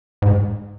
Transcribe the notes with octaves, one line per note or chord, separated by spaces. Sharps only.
G#2